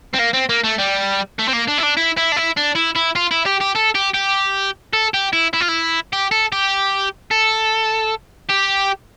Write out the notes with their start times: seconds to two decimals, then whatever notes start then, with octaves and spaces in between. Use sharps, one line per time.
0.15 C4
0.19 A#3
0.34 C4
0.49 A#3
0.64 A3
0.78 G3
1.39 A3
1.48 C4
1.53 A#3
1.68 D4
1.78 E4
1.83 D4
1.97 E4
2.17 E4
2.32 D4
2.37 E4
2.57 D4
2.76 E4
2.96 E4
3.16 F4
3.31 E4
3.46 G4
3.61 G4
3.76 A4
3.95 G4
4.14 G4
4.93 A4
5.14 G4
5.33 E4
5.54 E4
5.60 F4
5.68 E4
6.13 G4
6.31 A4
6.52 G4
7.31 A4
8.49 G4